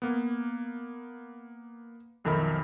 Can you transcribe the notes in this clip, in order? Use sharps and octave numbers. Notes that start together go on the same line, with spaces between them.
A#3 B3
B1 F2 D#3 A#4 E5 B5